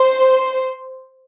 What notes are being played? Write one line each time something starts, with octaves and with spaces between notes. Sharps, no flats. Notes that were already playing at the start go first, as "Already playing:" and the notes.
Already playing: C5